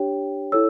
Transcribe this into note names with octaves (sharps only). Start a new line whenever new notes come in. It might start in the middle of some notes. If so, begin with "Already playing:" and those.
Already playing: D4 G4 C#5 G5
E4 A4 C#5 E6